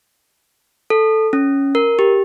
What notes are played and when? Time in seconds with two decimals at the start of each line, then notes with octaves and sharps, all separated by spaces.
0.90 A4
1.33 C#4
1.75 A#4
1.99 G4